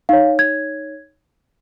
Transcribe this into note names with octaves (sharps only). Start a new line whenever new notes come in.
D#4 C#5 F5
G#6